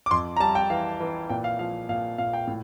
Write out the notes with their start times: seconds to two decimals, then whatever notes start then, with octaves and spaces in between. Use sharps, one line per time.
0.06 D6
0.11 F2 C6
0.37 A#5
0.40 G3 A5
0.55 G5
0.70 E3 F5
1.00 E3
1.29 A#2 G5
1.44 F5
1.59 F3 F5
1.89 A#2 F5
2.18 A#2 F5
2.33 G5
2.47 A2